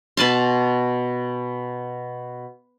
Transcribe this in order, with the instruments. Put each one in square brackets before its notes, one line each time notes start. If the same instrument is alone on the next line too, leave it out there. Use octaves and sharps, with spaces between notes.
[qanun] B2 B4 A5 C6